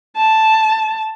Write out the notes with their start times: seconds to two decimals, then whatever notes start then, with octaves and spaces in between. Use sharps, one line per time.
0.17 A5